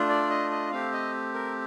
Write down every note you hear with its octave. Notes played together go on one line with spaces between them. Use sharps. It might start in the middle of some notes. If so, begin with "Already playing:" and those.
Already playing: A3 D4 F4
D5
D#5
D#5
A3 C4 G4 F5
D#5
A#4